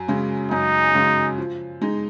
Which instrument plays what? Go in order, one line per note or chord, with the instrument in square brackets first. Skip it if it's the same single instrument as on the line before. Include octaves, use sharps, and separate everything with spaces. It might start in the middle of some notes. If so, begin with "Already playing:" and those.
Already playing: [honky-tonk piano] F#2
C#3 G#3
[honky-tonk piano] F#2 [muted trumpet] D#4
[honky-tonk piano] C#3 G#3
F3
G#3 D#4